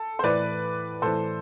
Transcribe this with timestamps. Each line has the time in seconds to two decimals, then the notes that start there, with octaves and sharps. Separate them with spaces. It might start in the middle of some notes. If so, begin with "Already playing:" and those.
Already playing: A4
0.19 C5
0.23 A2 E3 B4 D5
1.02 A2 E3 A4 C5